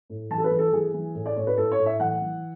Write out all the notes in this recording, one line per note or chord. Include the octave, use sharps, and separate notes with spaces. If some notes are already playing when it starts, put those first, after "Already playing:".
A2
E3 A5
A4
B4
E3
A4
E3 G#4
E3
A2
D5
A2 C#5
B4
A2 A4
C#5
A2
E5
E3 F#5
E3